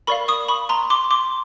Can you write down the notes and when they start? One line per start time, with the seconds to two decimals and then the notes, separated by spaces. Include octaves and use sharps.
0.07 A#4 D5 F5 B5 C#6
0.28 C#6 D#6
0.48 B5 C#6
0.69 A#5 C6
0.90 C6 D6
1.11 C6 D6